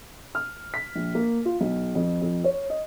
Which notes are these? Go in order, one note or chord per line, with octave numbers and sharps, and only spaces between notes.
F6
B6
A#1
A#3
F4
B1
F2
F2
C#5
D#5